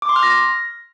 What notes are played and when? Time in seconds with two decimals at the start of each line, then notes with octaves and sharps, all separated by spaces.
0.02 D6
0.09 C6
0.16 F6
0.23 A#6